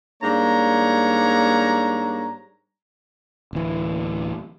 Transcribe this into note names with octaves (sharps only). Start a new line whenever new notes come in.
G#2 G3 A#3 D4 C#5 A#5
D1 E3